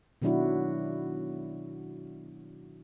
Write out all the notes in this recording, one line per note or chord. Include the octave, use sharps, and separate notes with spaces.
B2 D#3 F#3 D4 E4 F#4